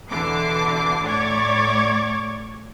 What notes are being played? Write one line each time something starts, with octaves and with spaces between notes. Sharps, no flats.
E2 B2 D3 E3 D6 C7
A2 C#5 D5 C#6 D6 G#6